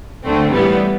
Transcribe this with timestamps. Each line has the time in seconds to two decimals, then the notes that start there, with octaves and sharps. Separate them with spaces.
0.23 D2 D3 A3 C4
0.51 A2 E3 G3 B3